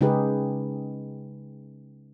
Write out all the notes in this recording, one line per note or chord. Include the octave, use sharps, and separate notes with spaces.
C#3 G#3 D#4 G4 G#4 B4